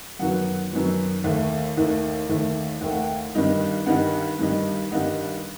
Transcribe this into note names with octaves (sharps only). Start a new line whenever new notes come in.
F#2 D#3 F#3 B3 F#5
F#2 D#3 F#3 B3
D#2 D#3 A3
D#2 D#3 A3
D#2 D#3 A3
D#2 D#3 A3 G5
F#5
G5
G2 D#3 G3 D#4
G2 D#3 G3 D#4 F#5
G2 D#3 G3 D#4
G2 D#3 G3 D#4 F#5